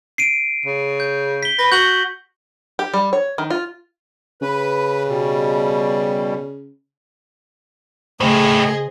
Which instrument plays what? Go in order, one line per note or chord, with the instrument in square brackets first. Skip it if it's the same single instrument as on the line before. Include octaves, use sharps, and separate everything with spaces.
[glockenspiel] C7 D7 D#7
[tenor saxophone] C#3
[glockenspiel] G6
B6 G7
[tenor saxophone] B4 [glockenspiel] A#6
[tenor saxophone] F#4 [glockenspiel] G6 F#7 G7
[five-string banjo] G4
G3
C#5
D#3
F4
[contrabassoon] C#3 [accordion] B4
[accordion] B2 G3
[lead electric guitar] A2 G4 [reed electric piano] C#3 C5 [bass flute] A3 [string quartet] G#4 D#5